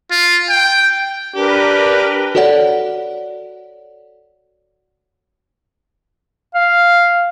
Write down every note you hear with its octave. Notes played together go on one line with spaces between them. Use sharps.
F4
G5
D4 G4 A#4 B4
F#4 A4 C#5 D5 F#5
F5